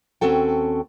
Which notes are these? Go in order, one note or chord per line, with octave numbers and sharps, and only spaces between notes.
D#2 C4 C#4 F#4 A4 G5